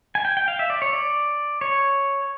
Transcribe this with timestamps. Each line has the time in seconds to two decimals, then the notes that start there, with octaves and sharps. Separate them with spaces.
0.15 G#5
0.25 G5
0.37 G5
0.48 F5
0.59 E5
0.70 D5
0.82 C#5
0.93 D5
1.61 C#5